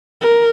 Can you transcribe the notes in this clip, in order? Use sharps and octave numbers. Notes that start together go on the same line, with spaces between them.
A#4